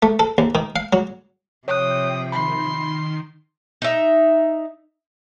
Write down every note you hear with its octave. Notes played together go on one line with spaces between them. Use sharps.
A3
A4
D#2
D#3
F5
F#3
C3 F3 C#5 G5 D#6 F#6
D#3 B5 C6
D#4 E5